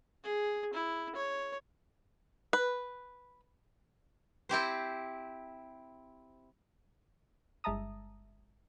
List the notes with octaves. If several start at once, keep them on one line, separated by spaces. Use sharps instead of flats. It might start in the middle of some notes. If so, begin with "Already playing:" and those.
G#4
E4
C#5
B4
C4 E4 G4 C5
G1 G#3 E5 A5 A#5 D#6